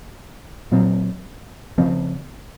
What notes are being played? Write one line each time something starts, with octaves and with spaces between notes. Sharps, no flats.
A#2 F#3 C4
C#3 F3 C4